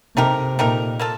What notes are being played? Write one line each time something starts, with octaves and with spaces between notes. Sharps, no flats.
C3 A3 D#4 G4 A#4
A#2 A3 D#4 G4 A#4
A#3 F4 A4